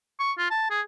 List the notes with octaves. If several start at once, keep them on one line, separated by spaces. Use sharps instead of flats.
C#6
F4
A5
G#4